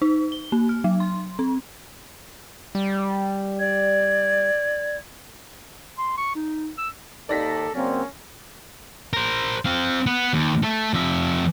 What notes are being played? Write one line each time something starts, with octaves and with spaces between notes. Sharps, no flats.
D#4
G7
A#3
F6
F#3
C6
C4
G3
D5 G#6
C6
C#6
D#4
E6
D#2 D#4 A4 D5 A#6 B6
C#3 F#3 A#3 C4 C#4
A#4 C5
C4 F5
B3
D#2
A3
F2 E5